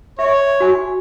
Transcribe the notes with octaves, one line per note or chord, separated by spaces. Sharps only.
C#5 E5
F#4 G#5